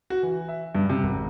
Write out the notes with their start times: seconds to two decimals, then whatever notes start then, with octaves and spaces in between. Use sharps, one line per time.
0.10 F#4
0.23 E3
0.48 E5
0.75 G2
0.89 C3
1.03 G#1